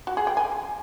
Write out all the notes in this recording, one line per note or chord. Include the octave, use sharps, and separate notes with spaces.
F#4
G#4
G5
G#5